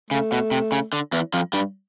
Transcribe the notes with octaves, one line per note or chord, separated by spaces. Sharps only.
C#3 A3
B2
C3
C#3
D3
E2 E3
F2 F3
G2 G3